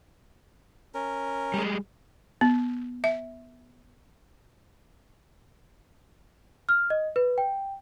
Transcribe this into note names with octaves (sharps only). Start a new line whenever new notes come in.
C#4 A#4
G3 G#3
B3
E5
F6
D#5
B4
G5